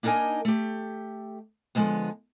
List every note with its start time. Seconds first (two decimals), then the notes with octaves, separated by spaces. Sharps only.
0.03 A#3 D4 D#4 A#4 D#5 G#5
0.45 A3 G4
1.75 D3 F3 G#3 A#3 B3